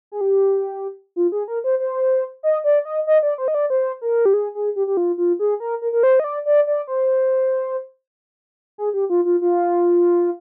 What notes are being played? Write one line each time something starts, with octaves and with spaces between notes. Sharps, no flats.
G#4
G4
F4
G#4
A#4
C5
C5
D#5
D5
D#5
D#5
D5
C5
D#5
D5
C5
A#4
G4
G#4
G#4
G4
G4
F4
F4
G#4
A#4
A#4
A#4
C5
D#5
D5
D5
D5
C5
G#4
G4
F4
F4
F4